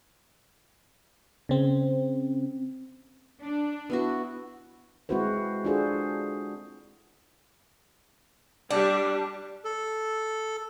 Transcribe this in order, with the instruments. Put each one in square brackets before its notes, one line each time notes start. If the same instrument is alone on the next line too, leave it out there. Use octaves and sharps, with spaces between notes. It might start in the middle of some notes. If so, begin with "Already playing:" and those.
[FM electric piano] C#3 C4
[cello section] D4
[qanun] B3 E4 F#4
[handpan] G#3 C4 E4 F#4 B4 C5
D4 F4 F#4 G#4 A4 C5
[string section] G3 [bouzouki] D4
[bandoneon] A4